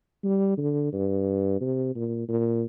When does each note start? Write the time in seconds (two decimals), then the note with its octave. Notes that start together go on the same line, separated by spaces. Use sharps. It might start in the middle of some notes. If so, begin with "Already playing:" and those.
0.24 G3
0.58 D3
0.92 G2
1.61 C3
1.95 A#2
2.29 A#2